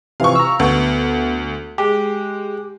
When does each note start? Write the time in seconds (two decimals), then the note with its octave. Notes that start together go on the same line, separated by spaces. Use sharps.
0.20 C3 E3 F3 F5 C#6
0.35 A#5 E6
0.60 D2 B3
1.78 G#3 G4